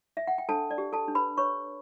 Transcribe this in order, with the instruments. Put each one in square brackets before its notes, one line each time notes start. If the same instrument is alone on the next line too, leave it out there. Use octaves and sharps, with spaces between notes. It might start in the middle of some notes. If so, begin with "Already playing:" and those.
[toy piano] E5
F#5
G5
D4 A4 A5
D5
G4
A4 A5
D4
B4 B5
B4 C#5 C#6